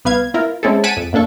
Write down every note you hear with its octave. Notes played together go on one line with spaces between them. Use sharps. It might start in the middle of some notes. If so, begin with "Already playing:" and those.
C2 B3 B4 F5 G#6
E4 F4 A#4
G#3 C4 C#4 E4 G#4 A4
F#5 G#5 A5 B6 D7 D#7
F2
F#2 A#3 D4 A4 C#6